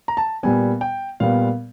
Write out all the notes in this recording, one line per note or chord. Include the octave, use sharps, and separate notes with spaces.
A#5
A5
A#2 G3 B3 G#5
G5
A#2 G3 B3 F5